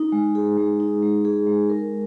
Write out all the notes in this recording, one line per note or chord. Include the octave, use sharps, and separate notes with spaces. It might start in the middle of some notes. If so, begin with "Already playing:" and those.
Already playing: D#4
G#3
G#4
G#3
D#4
G#3
G#4
G#3
A#4